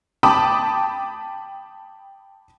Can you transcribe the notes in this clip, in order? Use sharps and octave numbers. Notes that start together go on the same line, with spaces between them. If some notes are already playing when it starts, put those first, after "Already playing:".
G5 A5 B5 D6 D#6